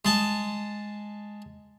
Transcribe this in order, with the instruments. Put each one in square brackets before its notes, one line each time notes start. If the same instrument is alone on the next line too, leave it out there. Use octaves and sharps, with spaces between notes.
[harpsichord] G#3 A5